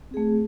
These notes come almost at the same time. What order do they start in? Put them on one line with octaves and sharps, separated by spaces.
C4 G#4 A3